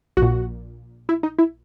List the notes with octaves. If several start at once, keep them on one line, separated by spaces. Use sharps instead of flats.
A#1 F#4
A#2
E4
D#4
E4